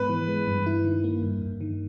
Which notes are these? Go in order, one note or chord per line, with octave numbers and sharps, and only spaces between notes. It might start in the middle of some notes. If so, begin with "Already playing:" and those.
Already playing: G#2 G#3 B3 B4
E3
G#3
G2
E4
D#3
A#3
G2
G2
D#3